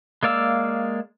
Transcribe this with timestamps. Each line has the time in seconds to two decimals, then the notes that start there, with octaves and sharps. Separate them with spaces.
0.23 G#3 A#3 D5 F5 E6